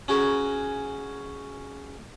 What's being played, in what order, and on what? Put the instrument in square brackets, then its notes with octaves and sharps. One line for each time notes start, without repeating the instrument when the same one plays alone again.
[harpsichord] C#4 F#4 G#4 A#4